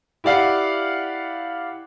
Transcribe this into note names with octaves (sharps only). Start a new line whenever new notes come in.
E4 G4 D5 F5 F#5